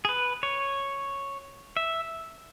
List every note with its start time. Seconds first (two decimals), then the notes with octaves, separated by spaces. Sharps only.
0.05 G#4
0.09 B4
0.43 C#5
1.77 E5